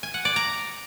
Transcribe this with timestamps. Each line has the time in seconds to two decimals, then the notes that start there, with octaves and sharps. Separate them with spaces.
0.03 G#5
0.14 F#5
0.25 D5
0.36 A#5